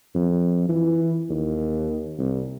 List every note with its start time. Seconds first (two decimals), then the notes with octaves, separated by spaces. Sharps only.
0.15 F2
0.69 E3
1.30 D#2
2.18 C2